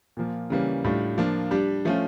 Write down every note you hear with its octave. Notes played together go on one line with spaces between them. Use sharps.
A#2 F3 A#3
C#3 E3 G3 A#3 C#4
A2 G3 D4 F4
F3 A#3 D4 F4
G3 D4 G4
F3 A3 C#4 F4